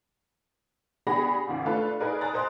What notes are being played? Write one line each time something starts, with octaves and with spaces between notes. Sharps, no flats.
B3 D4 G4 G#4 B5 A#6
G#1 C#2 G#2
A3 D4 F4 A4 B4
D#4 G#4 A#4 B4 D5
G#5 A#5 D#6 F#6 A6
A#4 C5 D#5 C6 F#6